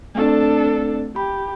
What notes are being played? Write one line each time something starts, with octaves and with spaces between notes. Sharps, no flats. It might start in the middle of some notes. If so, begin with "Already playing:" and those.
A3 C4 D4 A4
G4 B5